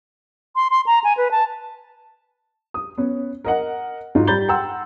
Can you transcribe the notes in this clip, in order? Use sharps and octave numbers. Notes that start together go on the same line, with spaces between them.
C6
C6
A#5
G#5
B4
A5
D#6
B3 C#4
A#4 D#5 F#5
G#2 D#4 F4 F#4
G3 A#5 B5 G6 A6 G7
F#5 G5 A#5 C6 E6